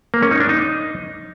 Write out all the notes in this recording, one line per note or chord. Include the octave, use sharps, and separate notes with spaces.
A#3
C#4
D#4
D4
D#4